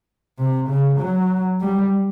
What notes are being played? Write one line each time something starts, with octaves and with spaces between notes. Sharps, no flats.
C3
C#3
F#3
G3